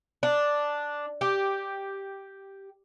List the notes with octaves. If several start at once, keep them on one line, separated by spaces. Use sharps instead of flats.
D4
G4